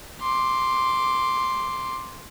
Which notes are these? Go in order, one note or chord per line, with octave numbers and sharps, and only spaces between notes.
C6 D6